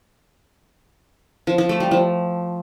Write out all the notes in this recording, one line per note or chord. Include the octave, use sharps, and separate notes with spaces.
F3
F3
A3
G3
F3